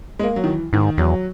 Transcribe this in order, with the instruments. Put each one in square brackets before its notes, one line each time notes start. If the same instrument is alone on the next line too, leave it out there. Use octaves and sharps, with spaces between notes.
[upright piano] G#3
A#3
F#3
D#3
E3
[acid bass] G#2 [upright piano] D#3
[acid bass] E2 [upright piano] F#3